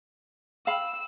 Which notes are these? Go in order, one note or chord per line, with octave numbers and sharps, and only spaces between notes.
F5 B5 E6